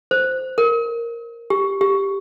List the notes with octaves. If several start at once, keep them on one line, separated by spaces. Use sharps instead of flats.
C5
A#4
G4
G4